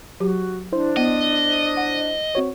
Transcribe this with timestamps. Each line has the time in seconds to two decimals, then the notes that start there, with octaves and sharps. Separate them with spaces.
0.20 F#3 F#4 G4
0.72 D4 E4 C5
0.97 B3 D#5
1.77 F#5
2.35 C4 F#4 C#5